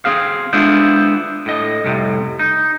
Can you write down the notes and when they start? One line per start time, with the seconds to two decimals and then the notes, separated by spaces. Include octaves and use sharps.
0.05 C4 G#4 F5
0.53 G#3 B3 D4 E4 F4 C5
1.46 A2 D#5
1.85 C2 F2 A2 C3
2.39 D#4